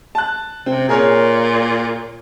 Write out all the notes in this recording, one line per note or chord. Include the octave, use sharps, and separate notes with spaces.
A5 F#6
C3 C4
A#2 G#4 A#4 C#5